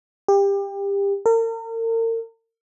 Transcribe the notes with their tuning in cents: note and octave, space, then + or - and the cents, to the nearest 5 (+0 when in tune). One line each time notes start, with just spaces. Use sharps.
G4 +25
A#4 -40